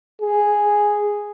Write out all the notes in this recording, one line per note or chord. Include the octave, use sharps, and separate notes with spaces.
G#4